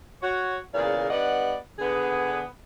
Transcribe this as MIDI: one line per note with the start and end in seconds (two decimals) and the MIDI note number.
0.22 0.57 66
0.22 0.57 73
0.73 1.09 40
0.73 1.09 46
0.73 1.09 49
0.73 1.09 70
0.73 1.09 74
0.73 1.09 77
1.10 1.55 43
1.10 1.55 55
1.10 1.55 59
1.10 1.55 74
1.10 1.55 75
1.10 1.55 78
1.79 2.41 50
1.79 2.41 59
1.79 2.41 68